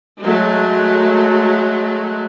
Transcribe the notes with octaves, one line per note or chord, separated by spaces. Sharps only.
F#3 G#3 A3